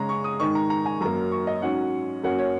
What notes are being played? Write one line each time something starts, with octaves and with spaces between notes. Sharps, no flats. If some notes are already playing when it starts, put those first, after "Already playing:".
Already playing: C#3 G#3 C#4 A#5
C#6
D#6
G#2 D#3 G#3 C#6
A#5
A#5
G#5
F#2 F#3 A#3 A#5
C#6
D#5
G#2 F#3 C#4 F#5
F#2 F#3 A#3 C#4 F#5
C#5